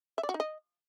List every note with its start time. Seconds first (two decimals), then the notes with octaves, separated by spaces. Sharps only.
0.18 E5
0.23 D5
0.29 F#4
0.34 D#4
0.40 D#5